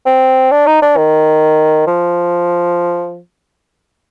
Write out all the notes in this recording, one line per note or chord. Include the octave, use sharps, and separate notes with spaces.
C4
D4
D#4
D4
D#3
F3